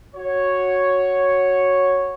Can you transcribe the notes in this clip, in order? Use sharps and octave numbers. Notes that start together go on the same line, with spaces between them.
F#4 C#5